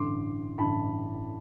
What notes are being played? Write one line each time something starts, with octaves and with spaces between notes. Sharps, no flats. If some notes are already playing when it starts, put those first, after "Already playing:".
Already playing: A1 G2 D3 C6 D6
A1 G2 D3 A5 B5